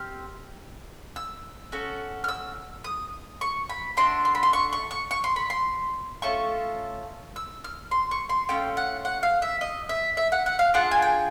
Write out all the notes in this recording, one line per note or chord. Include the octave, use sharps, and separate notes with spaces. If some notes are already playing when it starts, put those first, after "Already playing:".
Already playing: C4 G4 F6
E6
C#4 F#4 A4
F6
E6
D#6
C#6
B5
A3 D4 F#4 C6
C6
B5
C6
C#6
C#6
C#6
C#6
C6
B5
C6
A3 C#4 F4 A4 C#6
E6
F6
C6
C#6
C6
A3 C#4 F4 G5
F#5
F#5
F5
E5
D#5
E5
E5
F#5
F#5
F5
D4 F4 G#4 F#5
G#5
G5